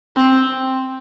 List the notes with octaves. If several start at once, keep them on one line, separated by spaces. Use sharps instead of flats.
C4